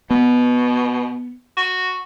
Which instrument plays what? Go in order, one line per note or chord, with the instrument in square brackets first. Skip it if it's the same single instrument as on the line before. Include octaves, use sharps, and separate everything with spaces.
[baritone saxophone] B2 [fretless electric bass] B3
[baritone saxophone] F#4